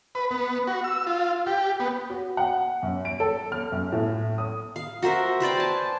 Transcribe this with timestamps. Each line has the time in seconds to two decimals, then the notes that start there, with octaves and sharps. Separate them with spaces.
0.15 B4
0.31 B3
0.67 F#4
0.84 E6
1.07 F4
1.47 G4
1.80 B3
2.10 F#4
2.37 F#5
2.83 F#2
3.05 D7
3.20 A4
3.52 F6
3.72 F#2
3.92 A2
4.38 D#6
4.76 F5
5.02 F#4 A#4 C5 E5
5.40 B4 C5 D5 G5
5.57 G#5 A5